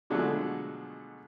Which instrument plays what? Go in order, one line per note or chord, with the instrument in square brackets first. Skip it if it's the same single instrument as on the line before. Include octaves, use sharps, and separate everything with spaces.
[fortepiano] B2 D3 F3 F#3 G#3 A3